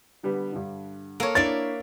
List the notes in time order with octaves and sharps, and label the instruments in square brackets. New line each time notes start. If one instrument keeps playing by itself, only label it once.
[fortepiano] D3 G3 B3
G2 D3
[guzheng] A#3 C#5 [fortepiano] A4
[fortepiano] D4 E4 C#5 [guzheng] D5 E5 F5 [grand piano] A6